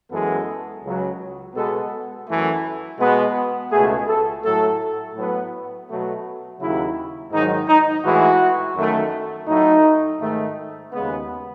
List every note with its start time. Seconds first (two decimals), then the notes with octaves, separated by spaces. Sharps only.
0.11 F#2 E3 G#3 B3 A4
0.83 C#2 C#3 F#3
1.55 B2 G#3 B3 A4
2.27 F#2 E3 A3
3.00 B2 G#3 B3
3.71 C#2 B2 A3 G#4
4.08 A4
4.43 A2 F#3 A3 A4
5.16 A2 F#3 B3
5.88 B2 F#3 A3
6.60 D#2 C#3 F#3 E4
7.32 G#2 D#3 F#3 D#4
7.68 D#4
8.04 A2 E3 G#3 F#4
8.76 F#2 D#3 A3
9.48 A2 F#3 A3 D#4
10.20 G#2 D#3 A3
10.92 D#2 C#3 G#3 B3